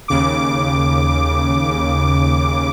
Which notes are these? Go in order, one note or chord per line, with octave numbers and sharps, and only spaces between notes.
D#2 C#3 D6